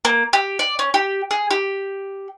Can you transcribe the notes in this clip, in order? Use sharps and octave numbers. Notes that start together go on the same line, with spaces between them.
A#3
G4
D5
C#4
G4
G#4
G4